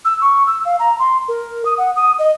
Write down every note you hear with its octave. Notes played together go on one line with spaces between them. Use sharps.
E6
C#6
E6
F5
A#5
C6
A#4
D#6
F#5
D#6
D#5